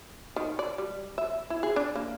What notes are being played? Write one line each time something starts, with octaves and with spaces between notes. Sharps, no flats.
D#3
D5
G3
E5
E4
G#4
D4
A#3